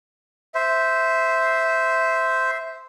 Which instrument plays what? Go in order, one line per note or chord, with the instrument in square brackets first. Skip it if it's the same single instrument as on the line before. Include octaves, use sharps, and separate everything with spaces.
[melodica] C5 [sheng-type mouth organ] E5